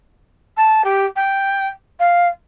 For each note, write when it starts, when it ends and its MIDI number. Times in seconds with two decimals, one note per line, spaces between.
0.57 0.82 81
0.84 1.06 67
1.16 1.68 79
2.00 2.28 77